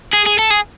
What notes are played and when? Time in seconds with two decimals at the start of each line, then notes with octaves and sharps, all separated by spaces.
0.13 G#4
0.26 G#4
0.39 A4
0.51 G#4